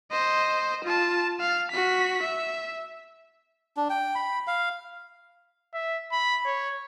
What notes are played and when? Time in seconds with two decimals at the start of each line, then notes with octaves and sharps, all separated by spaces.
0.12 C5 D#5
0.84 F4 A5
1.40 F5
1.71 F#4 B6
2.22 E5
3.77 D4
3.90 G5
4.15 B5
4.47 F5
5.74 E5
6.12 B5
6.46 C#5